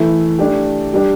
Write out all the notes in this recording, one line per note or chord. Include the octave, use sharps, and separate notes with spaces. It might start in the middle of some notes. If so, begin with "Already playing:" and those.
Already playing: E3 A3 E4
E3 A3 D4 G4
G3 D4 G4